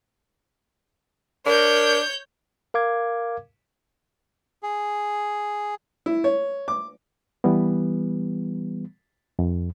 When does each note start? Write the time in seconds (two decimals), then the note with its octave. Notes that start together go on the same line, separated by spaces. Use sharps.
1.46 D4 A#4 C#5 G6
2.74 A#4 F5 D6 G#6
4.63 G#4
6.06 E4
6.24 C#5
6.68 D6
7.44 E3 G3 B3
9.39 F2